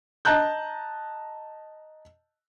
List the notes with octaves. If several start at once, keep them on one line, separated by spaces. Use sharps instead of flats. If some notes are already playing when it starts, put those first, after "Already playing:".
D#5 A5 A#5 F#6 G6